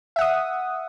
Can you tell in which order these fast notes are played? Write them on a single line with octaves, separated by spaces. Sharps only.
E5 F#5 D#6